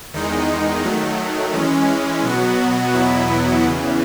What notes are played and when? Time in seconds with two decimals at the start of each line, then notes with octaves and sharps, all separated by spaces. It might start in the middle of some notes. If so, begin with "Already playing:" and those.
0.14 E2 D#3 G#3 D#4
0.83 D#3 F#3 A3
1.53 E3 G#3 C#4
2.23 B2 F#3 B3 F#4
2.93 E2 B2 F#3 B3 E4
3.63 E2 C#3 E3